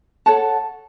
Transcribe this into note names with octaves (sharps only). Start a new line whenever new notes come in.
A4 C#5 F#5 A5